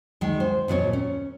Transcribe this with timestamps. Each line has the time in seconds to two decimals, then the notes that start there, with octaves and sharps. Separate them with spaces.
0.21 D2 D#3 G#3
0.40 C5
0.68 D#2 A#2 F#4 C#5
0.93 C#4